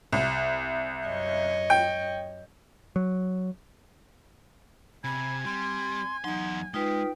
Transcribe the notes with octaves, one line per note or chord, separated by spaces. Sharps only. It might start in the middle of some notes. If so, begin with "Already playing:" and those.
C2
F#2 C#5 D#5
G5
F#3
C3 G#5 B5
G3 C4 C6
E2 F#3 D#4 C6
G#3 D#4 F4 B4 G5